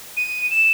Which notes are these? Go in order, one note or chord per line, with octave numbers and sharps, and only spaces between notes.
D#7
E7